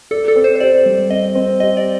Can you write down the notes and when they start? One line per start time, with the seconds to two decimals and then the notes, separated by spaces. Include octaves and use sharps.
0.11 A4 D5
0.28 A4
0.36 C4
0.44 C5
0.56 C5
0.60 G4 D5
0.86 G3
1.10 C4 D#5
1.35 C4
1.60 G4 D#5
1.77 D5